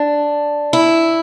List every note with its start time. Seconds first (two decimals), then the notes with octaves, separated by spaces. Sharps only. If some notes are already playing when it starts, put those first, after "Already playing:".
Already playing: D4
0.73 E4